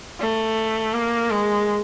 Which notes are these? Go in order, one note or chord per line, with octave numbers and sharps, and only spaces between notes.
A3
A#3
G#3